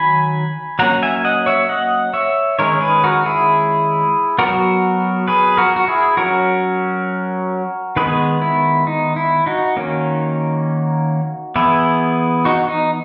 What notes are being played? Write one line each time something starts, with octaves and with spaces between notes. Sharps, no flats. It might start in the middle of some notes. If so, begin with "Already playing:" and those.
Already playing: D#3 F#3 G#5 B5
F#3 A#3 C#4 F#5 A#5
E5 G#5
D#5 F#5
C#5 E5
D#5 F#5
C#5 E5
D#3 G#3 C#4 A#4 C#5
G#4 B4
F#4 A#4
E4 G#4
F#3 B3 F#4 A#4
G#4 B4
F#4 A#4
F#4
E4 G#4
F#3 C#4 F#4 A#4
D#3 G#3 B3 G#4 B4
E4
D#4
E4
D#4 F#4
D#3 A#3 C#4
E3 B3 E4 G#4
D#4 F#4
D#4